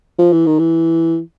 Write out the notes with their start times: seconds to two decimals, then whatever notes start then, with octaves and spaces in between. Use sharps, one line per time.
0.19 F3
0.32 E3
0.46 D#3
0.59 E3